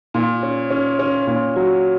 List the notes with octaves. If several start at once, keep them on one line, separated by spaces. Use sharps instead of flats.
A#2
C#4
C#4
C#4
A#2
F#3